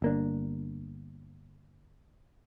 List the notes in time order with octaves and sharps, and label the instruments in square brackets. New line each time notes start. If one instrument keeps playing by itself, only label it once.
[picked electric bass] G1 A#3 D4